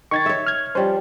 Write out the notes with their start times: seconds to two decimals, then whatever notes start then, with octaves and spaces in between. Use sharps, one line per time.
0.11 D#3 C#6 G#6 A6
0.26 C#5 E5
0.47 F6 G#6
0.75 F3 G3 C#4 C5